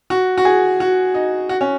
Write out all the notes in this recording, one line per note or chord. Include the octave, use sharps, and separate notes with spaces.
F#4
F#4
G#4
F#4
D#4
F#4
C#4